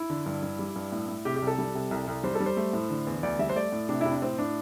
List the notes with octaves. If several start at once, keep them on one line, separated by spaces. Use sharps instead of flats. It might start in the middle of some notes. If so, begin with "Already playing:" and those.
Already playing: E4
D3
G2
G2
G3
G2
A2
A2
C3 G4
G4
C2
A4
G3
C3
C2
C2
G3 C5
A4
G3
C5
A3
A2
D3
E2
D2 D5
G3 E5
C5
A3 D5
A2
C3 D4
C3 E4
D4
A2 C4
A2 D4